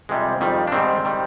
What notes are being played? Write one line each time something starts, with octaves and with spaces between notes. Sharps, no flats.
F2 C3 G3 G#3
F2 D#3 G3
D4
G#2 D#3 G3 C4
D#3 G3